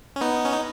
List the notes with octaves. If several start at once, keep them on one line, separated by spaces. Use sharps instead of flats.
C#4
B3 D#4
C#4
D#4